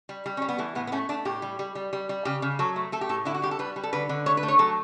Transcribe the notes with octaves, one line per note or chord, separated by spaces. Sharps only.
G3
G3
G3 C#4
B3
E3 A3
A2 B3
B3
A3 C#4
A3 D4
A2 G4
G3
G3
G3
G3
G3
C#3 G4
C#3
F#3 A4
A3
A3 A4
G4
A2 A4
D3 E4
F#4
G3 G4
A4
G3 B4
G3
A4
D3 B4
D3
A3 C#5
B4
A3
C#5
F#3 A4